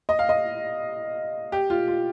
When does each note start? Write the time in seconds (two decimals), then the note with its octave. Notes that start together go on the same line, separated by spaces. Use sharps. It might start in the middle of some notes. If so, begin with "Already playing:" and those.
0.09 D#5
0.19 F5
0.29 D#5
1.52 G4
1.70 F4
1.88 F4